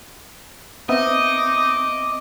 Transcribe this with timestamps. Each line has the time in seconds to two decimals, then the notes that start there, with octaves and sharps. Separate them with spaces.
0.89 B3 C4 D#4 D#5 E5 D6